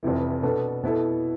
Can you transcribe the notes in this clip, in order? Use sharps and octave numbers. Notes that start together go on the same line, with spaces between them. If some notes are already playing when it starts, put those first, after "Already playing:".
F1 F2 C3 E3
B2 B3 D4 A4
B2 B3 E4 A4